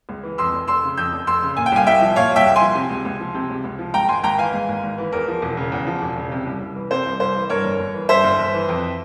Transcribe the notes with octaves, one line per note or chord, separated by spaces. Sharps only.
C#2
E3
F2 C6 E6
F1
F1 C6 E6
C#3
F2 E6 G6
F1
F1 C6 E6
C#3
A#2 G#5
G5
C2 F5 G#5
C2 E5 G5
F3
A#2 C#5 F5
C2 E5 G5
C2
F3 G#5 C6
C3
C#2
C#2
F3
C3
C#2
C#2
F3
G#2 G5 A#5
G#1 G#5 C6
G#1 G5 A#5
E3 F5 G#5
G#2
G#1
G#1
E3
E2 A#4
F3
E1
C#3
E2
F3
E1
C#3
C3
C2
C2
E3
C3 C5
C2
C2 C5
E3
G2 A#4 C#5
G1
G1
E3
G2 C5 E5
G1
G1
E3
F2